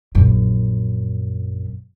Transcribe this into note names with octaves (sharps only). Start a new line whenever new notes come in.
A#1 F#2